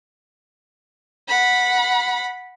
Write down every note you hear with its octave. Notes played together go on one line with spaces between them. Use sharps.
F#5 B5